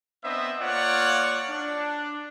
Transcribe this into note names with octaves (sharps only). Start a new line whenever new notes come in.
B3 C4 D4 C5 D#5 E5
A#3 F4 C#5 D5 F#5
D4